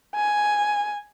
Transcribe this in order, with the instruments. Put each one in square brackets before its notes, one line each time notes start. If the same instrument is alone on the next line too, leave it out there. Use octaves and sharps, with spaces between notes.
[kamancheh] G#5